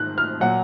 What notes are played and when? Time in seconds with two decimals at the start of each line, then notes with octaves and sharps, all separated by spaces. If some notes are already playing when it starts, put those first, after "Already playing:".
Already playing: G#2 D#3 F#6
0.18 F6
0.40 A#2 F#3 F#5